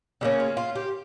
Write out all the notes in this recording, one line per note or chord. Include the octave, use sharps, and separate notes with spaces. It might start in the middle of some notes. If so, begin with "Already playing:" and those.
C#3 G3 A#3 C#4
F4
F4
G4